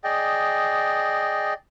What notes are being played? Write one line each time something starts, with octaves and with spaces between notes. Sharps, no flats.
G#4 D5 D#5 G5